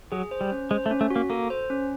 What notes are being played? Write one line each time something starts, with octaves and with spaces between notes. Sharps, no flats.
F#3 G#4
C5
G3
C#4
G#3 C5
A3
C#4
A3
F#4
A#3
A#3 A4
C5
C#4